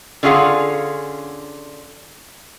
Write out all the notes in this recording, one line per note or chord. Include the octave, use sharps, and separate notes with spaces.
D3 C#4 F4 G#4 F5 F#5